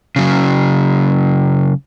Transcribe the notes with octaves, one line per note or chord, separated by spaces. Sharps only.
C#3 F#3